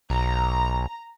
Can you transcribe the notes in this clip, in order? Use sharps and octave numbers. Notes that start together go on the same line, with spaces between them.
B1 A#5